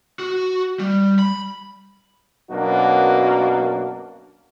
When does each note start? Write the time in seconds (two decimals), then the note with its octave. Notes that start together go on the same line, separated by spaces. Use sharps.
0.19 F#4
0.79 G3
1.19 B5
2.50 F#2 B2 F#3 A#3 D4 F#4